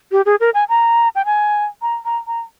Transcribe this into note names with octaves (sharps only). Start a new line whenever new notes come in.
G4
G#4
A#4
G#5
A#5
G5
G#5
A#5
A#5
A#5